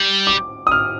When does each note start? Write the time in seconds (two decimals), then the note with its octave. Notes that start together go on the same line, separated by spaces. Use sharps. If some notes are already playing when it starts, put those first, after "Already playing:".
Already playing: G3
0.27 D6
0.67 D#6
0.71 F6